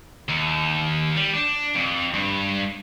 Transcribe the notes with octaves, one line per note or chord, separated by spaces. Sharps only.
D#2
G3
D4
F2
G2